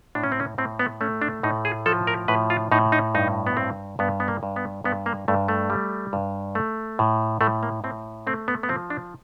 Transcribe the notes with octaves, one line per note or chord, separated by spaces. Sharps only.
A2 D4
C#4
C4
C#4
A2 C4
B3
A3 C#4
D4
A2 D#4
G#4
F3 A4
A#4
A2 B4
F4
A2 D#4
D#4
G2 D#4
B3
G2 C4
G2 B3
B3
A#3
G2
B3
G2 B3
A#3
G2 A3
A3
G3
G2
A3
A2
A2 A3
A#3
A2 C4
A3 C4
B3
B3
F3 C4
D4